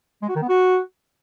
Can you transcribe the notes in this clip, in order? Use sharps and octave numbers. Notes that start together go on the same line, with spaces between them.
G#3
F#4
D#3
B3
F#4